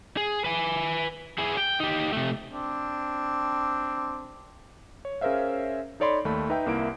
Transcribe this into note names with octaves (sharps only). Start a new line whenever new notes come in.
G#4
B4 G#5
E4 G#4
G5
D#4 G4
C3 A3
C4 D4
C#5
C#4 G#4 A#4 C5 E5 F5
D#4 A4 C#5 D5 B5 C6
D#2 A3 B5
D#4 B4 E5 G5
C2 A#3 E4 D7